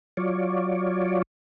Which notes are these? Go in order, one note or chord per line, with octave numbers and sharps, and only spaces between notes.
F#3 F4 C#5 D5